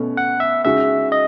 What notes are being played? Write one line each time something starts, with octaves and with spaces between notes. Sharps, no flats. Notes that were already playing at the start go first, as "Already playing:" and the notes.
Already playing: B2 A3 C#4
F#5
E5
C#3 G#3 D#4 F#4 E5
D#5